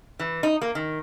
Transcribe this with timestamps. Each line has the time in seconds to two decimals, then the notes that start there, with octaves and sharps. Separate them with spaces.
0.19 E3
0.43 D#4
0.62 A#3
0.75 D#3